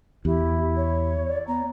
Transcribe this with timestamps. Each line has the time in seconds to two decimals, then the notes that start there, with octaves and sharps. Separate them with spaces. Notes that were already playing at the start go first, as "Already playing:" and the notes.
0.25 E2 E4 G4
0.76 C#5
1.27 D5
1.48 B3 A#5